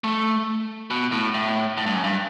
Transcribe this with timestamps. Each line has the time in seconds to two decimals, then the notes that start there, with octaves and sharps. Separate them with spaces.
0.04 A3
0.91 B2
1.12 A2
1.34 A2
1.77 A2
1.86 G2
1.95 F#2
2.04 G2